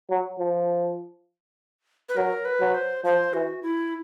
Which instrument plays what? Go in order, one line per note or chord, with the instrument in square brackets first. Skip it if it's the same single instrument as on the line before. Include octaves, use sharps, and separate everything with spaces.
[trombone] F#3
F3
[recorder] B4
[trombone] F#3 [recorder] A#4
[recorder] B4
[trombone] F#3
[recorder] C5
[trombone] F3 [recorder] C5
[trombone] E3 [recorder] F#4
[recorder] E4